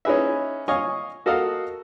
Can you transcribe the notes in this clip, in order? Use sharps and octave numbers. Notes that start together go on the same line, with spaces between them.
C#4 D#4 E4 G#4 B4 E5
C#5 D#5 F5 G#5 C#6
F#4 A4 A#4 D#5 F5